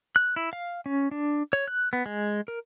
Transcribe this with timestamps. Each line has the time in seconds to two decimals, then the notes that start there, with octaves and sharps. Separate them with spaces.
0.16 F#6
0.36 E4
0.53 F5
0.86 C#4
1.11 D4
1.53 C#5
1.68 F#6
1.93 B3
2.06 G#3
2.48 A#4